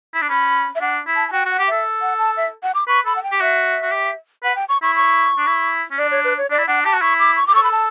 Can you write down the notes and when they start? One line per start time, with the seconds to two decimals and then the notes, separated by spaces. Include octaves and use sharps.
0.14 E4
0.22 D4
0.29 C#4 B5
0.75 E5
0.81 D4 F#5
1.07 E4
1.15 A5
1.28 A5
1.32 F#4 G5
1.45 F#4
1.50 F#5
1.59 G4
1.68 A4 E5
2.01 F#5
2.18 A5
2.37 E5
2.63 F#5
2.75 D6
2.88 B4 C#6
3.05 A4 B5
3.16 F#5
3.23 G5
3.32 G4
3.40 F#4 E5
3.82 F#4
3.92 G4
4.43 B4 F#5
4.56 G5
4.69 C#6
4.82 E4 C#6
4.95 C#6
5.38 D4
5.47 E4
5.91 C#4
5.98 D4 D5
6.11 C#5
6.24 B4
6.37 C#5
6.50 D4 D5
6.58 E4
6.67 D4 F#5
6.85 G4 A5
6.93 F#4
7.01 E4 C#6
7.19 D6
7.36 C#6
7.47 D6
7.53 A4 C#6
7.63 B5
7.72 A5